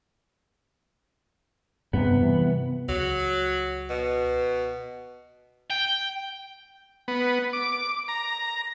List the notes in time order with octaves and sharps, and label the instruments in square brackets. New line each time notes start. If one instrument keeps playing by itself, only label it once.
[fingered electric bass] G2 C3 [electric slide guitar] B3
[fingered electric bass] C3 E3 G3
[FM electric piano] C#2 [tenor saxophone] F#3
[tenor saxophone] B2
[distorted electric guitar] G5
[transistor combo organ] B3
D6
A#5